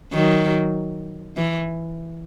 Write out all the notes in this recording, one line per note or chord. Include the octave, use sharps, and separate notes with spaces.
D#3 F#3
E3